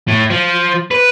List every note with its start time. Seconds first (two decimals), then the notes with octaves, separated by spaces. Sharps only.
0.08 A2
0.30 F3
0.91 B4